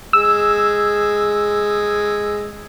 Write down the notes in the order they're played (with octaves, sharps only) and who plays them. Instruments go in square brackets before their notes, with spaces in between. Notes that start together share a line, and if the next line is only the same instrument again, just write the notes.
[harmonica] G#3 [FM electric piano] E6